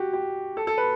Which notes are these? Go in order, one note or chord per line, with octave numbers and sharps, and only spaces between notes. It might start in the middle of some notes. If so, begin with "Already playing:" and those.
Already playing: F#4 G4
G4
A4
A4
B4